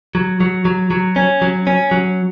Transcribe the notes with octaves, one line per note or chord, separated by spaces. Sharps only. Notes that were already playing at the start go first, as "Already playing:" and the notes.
F#3
F#3
F#3
F#3
C#4
F#3
C#4
F#3